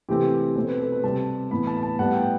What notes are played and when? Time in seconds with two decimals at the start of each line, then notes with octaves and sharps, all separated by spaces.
0.09 C3 E3 A3 C4 G4
0.56 B2 A3 C4 C5
0.68 B4
0.80 A4
0.92 B4
1.03 C3 G3 C4 A5
1.51 A2 E3 B3 B5
1.67 A5
1.77 B5
1.83 A5
1.99 A2 G3 B3 F#5
2.14 G5